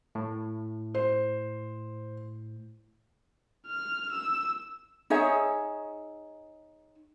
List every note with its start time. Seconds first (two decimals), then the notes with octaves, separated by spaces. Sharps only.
0.15 A2
0.94 C5
3.67 F6
4.12 E6
5.10 D#4 G#4 C#5 E5